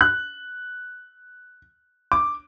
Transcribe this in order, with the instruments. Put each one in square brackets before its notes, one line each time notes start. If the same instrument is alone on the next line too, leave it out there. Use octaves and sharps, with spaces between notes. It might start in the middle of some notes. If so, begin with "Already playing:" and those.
[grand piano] F#6
D6